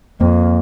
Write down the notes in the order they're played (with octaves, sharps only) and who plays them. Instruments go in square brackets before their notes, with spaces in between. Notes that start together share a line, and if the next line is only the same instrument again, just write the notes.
[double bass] F2 [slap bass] A#3